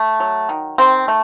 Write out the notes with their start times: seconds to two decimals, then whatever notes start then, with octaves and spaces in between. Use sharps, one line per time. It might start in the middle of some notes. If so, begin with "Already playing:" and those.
Already playing: A3
0.20 F#3
0.49 D#3
0.78 D#3 C4
1.08 A3